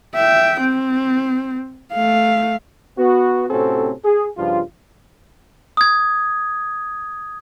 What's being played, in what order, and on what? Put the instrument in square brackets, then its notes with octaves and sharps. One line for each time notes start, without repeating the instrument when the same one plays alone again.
[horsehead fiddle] E5 G5
C4
A3 F5
[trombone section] B3 F#4
A2 C3 C4 C#4 F#4 A4
G#4
G2 C#3 F3 F4
[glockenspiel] D#6 G#6